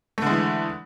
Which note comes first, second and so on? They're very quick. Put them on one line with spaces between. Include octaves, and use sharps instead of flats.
A3 D3 G#3 E3